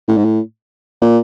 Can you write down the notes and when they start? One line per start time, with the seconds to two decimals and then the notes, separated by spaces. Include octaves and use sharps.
0.08 A2
0.17 G#2
0.25 A2
1.02 A#2